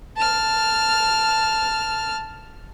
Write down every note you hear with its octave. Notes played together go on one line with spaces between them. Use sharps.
A5 F6